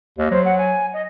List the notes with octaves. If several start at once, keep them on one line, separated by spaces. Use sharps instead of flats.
D#2 D#5
F#3 C5
F#5
G#5
D#5